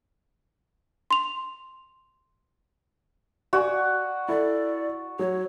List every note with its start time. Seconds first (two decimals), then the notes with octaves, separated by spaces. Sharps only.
1.11 C6 F7
3.53 F#4 D5 G#5
4.29 E4 A4 D5
5.19 F#3 C#5